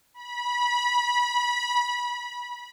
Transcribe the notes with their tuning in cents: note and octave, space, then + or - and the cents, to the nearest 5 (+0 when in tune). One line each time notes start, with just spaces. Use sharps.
B5 -25